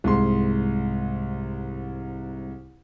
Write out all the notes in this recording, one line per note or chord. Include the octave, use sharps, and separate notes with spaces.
C2 G#2 C6